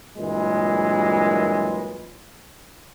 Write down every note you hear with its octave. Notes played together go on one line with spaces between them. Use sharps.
G2 A#2 E3 F#3 G#3